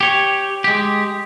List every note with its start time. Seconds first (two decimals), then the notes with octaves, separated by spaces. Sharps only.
0.01 G4 C#5
0.64 G#3 G4